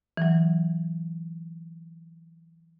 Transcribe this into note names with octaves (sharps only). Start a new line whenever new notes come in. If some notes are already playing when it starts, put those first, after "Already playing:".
E3 F#3